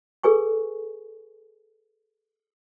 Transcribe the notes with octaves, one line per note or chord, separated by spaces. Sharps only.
G#4 A4 B4 G#5 C#6